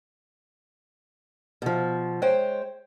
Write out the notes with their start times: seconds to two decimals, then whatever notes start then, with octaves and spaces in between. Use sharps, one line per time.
1.62 B2 F3
2.22 G#3 C5 C#5 G5